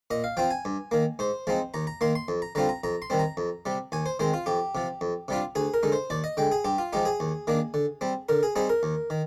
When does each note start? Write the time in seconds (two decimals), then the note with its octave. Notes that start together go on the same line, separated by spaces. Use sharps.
0.11 A#2 D#5
0.24 F5
0.37 F3 C4 F4 G5
0.51 G#5
0.65 G2
0.91 D#3 A#3
1.19 G#2 C5
1.47 F3 G#3 C4 D#4
1.74 D#2 A#5
1.87 A#5
2.01 D#3 A#3 C6
2.15 C6
2.28 F2
2.42 A#5
2.55 D3 G3 C4 F4 A#5
2.69 A#5
2.84 F2 A#5
3.02 C6
3.10 D#3 G3 C4
3.19 A#5
3.37 F2
3.66 C3 G3
3.92 D#2 G#5
4.06 C5
4.19 D#3 G#3 C4 C5
4.34 F4
4.46 F2 G4
4.75 C3 F3
5.01 F2
5.28 C3 G3 D4 F4
5.55 D2 G#4
5.74 A#4
5.83 D3 G#3 D#4
5.92 C5
6.10 D#2 D5
6.24 D#5
6.37 D3 G#3 G5
6.52 G#4
6.65 G2 G4
6.78 F4
6.93 F3 G#3 D#4 G4
7.05 G#4
7.20 D#2
7.47 D#3 A#3 D4
7.74 D3
8.01 G3 C4
8.29 D3 A#4
8.43 G#4
8.56 G3 C4 D#4 G#4
8.69 A#4
8.83 D#2
9.10 D#3